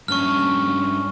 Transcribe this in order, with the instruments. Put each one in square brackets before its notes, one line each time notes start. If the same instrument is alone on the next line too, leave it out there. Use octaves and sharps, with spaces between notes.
[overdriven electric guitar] G2 C#4 [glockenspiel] C#6 F6